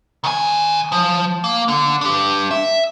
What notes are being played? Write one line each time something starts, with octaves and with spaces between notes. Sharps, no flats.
D#3 G#5
F3
A#3
D3
D4 G4
E5